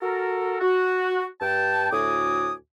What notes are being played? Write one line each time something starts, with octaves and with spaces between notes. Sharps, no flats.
F#4 A4 A#4
F#4
G2 G5 A5
D2 A2 F#4 G#5 D6 D#6